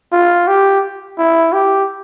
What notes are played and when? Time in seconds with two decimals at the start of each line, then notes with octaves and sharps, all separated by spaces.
0.13 F4
0.48 G4
1.18 E4
1.53 G4